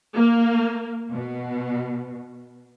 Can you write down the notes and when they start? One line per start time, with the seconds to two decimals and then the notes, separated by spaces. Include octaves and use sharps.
0.13 A#3
1.12 B2